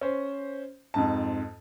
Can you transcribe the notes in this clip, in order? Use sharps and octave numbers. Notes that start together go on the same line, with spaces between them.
C#4 C5
F2 G#2 A5